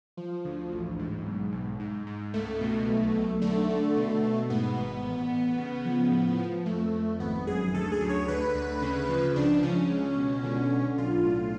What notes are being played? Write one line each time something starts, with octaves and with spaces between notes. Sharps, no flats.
F3
D2
A1
G#2
B1
B1
G#2
G#2
C#2 A3
B2
B1
B1
D3 A3
D3
B2
B2
G#2 B3
G#1
A1
A1
C#3
F3
A2
F3
F2 A3
F2
G#1 B3
F#2 G#4
D2 A4
G#4
D2
C#5
D3 B4
D2
C#3
F3
C#2 D4
C#3 C#4
C#2
B2
D3
D3
B1 F4
A2